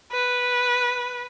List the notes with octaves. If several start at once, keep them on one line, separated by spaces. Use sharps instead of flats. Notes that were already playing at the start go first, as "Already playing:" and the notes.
B4